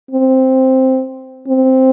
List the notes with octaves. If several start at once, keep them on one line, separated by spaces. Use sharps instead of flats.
C4
C4